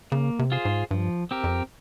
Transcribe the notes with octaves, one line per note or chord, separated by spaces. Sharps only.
C#3 A#3
C3
F4 G#4 C5
G#2
G2 F3
C4 G4 A#4
F2